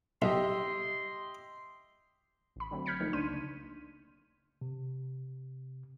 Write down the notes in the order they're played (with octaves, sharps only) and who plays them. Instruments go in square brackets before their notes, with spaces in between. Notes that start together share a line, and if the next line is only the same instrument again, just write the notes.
[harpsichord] B1 [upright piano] G4 D#5 E5 [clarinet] C6
[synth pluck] A1 B5
D3 F#3 A3 C4
F6 G6 G#6 B6 C#7
D3 F3 A3 A#3 D#4
C#2 C#3 A3 D4 C6 D#7
[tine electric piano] C3